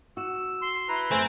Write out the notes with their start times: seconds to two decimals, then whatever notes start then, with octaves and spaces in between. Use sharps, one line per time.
0.17 F#4 E6
0.61 C6
0.89 E4 B4 A#5
1.11 F#2 A3 C4 G#5 E6